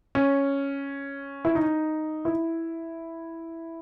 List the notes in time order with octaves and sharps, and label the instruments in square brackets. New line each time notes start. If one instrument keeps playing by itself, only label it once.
[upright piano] C#4
E4
D#4
E4